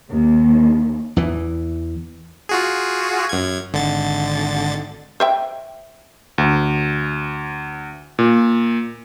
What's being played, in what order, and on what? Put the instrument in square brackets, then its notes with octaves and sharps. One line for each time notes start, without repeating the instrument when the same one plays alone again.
[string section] D#2
[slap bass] E2 E3
[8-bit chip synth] F4 F#4 G#4
F#2 G#6
G#1 D3 A6
[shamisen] C5 E5 G5
[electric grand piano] D2
A#2